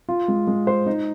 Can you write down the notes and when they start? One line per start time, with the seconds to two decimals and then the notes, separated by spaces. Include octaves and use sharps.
0.09 F4
0.28 G#3
0.47 G#3
0.67 C5
0.86 D#4